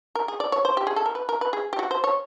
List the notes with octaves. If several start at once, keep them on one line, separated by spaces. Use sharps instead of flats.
A#4
G#4
D5
C#5
C5
G4
G#4
A4
A#4
B4
A#4
B4
G#4
G4
F#4
C5
C#5